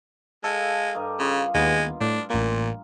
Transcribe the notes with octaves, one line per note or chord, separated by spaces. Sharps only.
G#3 A4 F5
G2 A#4 D#5
C#3 F4
D#2 G#3 B3
A2 D4
A1 A#2 A#3